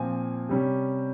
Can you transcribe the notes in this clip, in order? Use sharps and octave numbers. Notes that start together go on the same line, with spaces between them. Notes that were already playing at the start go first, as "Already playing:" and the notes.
Already playing: A#2 F3 C4 G#5
C3 G3 C#4